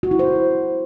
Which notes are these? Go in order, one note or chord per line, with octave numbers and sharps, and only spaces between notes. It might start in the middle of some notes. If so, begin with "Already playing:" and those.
F#4
E4
C5